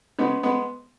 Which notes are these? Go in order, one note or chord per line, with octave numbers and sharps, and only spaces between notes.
C#3 G#3 B3
G#3 B3